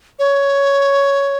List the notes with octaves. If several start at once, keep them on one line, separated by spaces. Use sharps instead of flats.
C#5